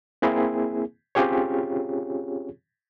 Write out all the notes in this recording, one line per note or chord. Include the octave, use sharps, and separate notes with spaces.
A#3 C4 E4 G#4
C4 C#4 F4 G4 G#4 C#5